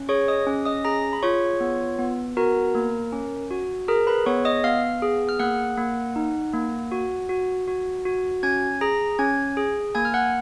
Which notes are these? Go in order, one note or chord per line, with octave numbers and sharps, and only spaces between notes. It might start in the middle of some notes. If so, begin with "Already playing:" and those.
Already playing: C#4
G#4 C#5 C#6
D#5 D#6
C#4
D#5 D#6
G#4 A#5 A#6
B5
F4 C#5 C#6
B3
B3
F#4 A#4 A#5
A#3
C#4
F#4
G#4 A#4 A#5
B4 B5
B3 C#5 C#6
D#5 D#6
B3 F5 F6
G#4
F6
A#3 F#5 F#6
A#3
D#4
A#3
F#4
F#4
F#4
F#4
C#4 G#5 G#6
G#4 A#5 A#6
C#4 G#5 G#6
G#4
A#3 G#5 G#6
F6
F#5 F#6